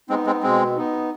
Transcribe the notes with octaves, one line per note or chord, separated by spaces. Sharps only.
G#3 B3 C4 D#4
G#3 C4
B2 G#3 C4
B3 D#4